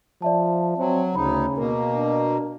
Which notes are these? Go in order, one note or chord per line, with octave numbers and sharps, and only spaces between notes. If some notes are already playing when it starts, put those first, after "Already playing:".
F3 D5 E5 A5
F#3 C4
D2 C#3 D#4 B5
B2 A#3 A#4
D4